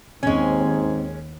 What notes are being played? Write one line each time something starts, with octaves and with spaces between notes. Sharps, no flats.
D#2 G#2 G#3 C4 C#4